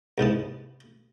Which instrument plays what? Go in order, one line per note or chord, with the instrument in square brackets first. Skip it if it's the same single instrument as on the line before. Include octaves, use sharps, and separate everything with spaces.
[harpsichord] C2 G#2 B3 A5